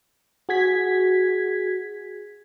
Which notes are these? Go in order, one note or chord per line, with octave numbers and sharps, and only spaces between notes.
F#4 G#4 G#6 B6